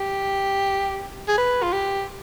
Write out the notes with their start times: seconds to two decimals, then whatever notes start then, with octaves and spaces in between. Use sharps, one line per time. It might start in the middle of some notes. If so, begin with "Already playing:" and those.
Already playing: G4
1.28 G#4
1.38 B4
1.63 F4
1.73 G4